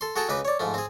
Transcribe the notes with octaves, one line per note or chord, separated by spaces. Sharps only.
A4 C6
F#4 G#4 A4 G5 A5 A#5
C#2 D#4 B4 D6
C#5 D5
G#2 F3 A3
C4 G#4